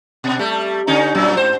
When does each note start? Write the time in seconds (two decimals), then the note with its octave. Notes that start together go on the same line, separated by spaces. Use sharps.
0.24 B2
0.39 G3 A3
0.87 D3 C#4 D#4
1.15 F#2 A#2 F#3
1.37 G#2 C5